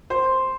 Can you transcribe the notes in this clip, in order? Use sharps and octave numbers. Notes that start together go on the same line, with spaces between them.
C5